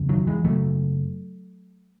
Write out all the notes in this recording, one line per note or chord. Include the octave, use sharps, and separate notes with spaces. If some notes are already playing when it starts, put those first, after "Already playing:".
Already playing: F#1 E2 C#3
D#3 F#3
E3 G#3
F#1 E2 C#3 F#3 A3